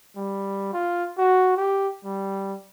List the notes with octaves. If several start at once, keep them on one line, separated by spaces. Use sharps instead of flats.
G3
F4
F#4
G4
G3